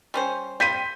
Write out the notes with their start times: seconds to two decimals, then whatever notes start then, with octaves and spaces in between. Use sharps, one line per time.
0.14 G3 C#4 C5
0.60 G3 C4 G6 B6 D#7